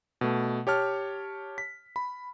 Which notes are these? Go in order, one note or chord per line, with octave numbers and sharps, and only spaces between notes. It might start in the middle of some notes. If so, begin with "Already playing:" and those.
B2 A3
G4 C#5 A5 F6
B6
B5